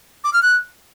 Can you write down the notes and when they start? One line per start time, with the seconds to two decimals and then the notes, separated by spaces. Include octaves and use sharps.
0.24 D6
0.33 F6
0.42 F#6